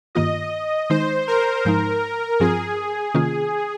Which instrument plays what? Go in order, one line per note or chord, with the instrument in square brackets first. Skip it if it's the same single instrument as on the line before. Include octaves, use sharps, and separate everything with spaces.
[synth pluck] G2 D#3 A#3 F4 [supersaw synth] D#5
[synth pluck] D#3 G#3 D#4 [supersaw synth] C5
[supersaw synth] A#4
[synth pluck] G#2 F3 G#3 D#4
[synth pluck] G2 F3 C4 F4 [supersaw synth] G#4
[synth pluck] C3 D#3 A#3 C#4 F4